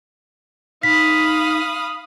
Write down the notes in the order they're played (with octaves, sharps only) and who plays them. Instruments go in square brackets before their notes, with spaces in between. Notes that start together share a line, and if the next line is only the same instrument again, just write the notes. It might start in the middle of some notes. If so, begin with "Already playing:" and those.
[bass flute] D#4 [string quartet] F5 B5 D#6 [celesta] B6